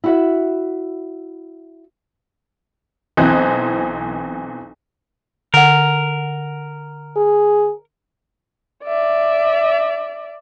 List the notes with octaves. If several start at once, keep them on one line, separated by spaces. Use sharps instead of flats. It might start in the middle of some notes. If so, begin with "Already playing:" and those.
E4 F#4 E5
B1 E3 C4 C5 D#5 F#6
D3 A#4 F#5
G#4
D5 E5